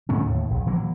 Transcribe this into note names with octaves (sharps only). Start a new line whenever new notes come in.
G#2 D3 A3 C#4
D#2 A2
A#1
E3 F#3 A#3